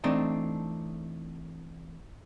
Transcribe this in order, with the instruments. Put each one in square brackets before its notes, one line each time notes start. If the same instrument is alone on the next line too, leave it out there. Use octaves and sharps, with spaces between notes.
[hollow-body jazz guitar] E3 A3 C4 D4 D#4 D#5